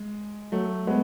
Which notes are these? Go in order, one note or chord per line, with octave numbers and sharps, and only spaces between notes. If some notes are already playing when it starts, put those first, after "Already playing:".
Already playing: G#3
F#3 A3
G#3 B3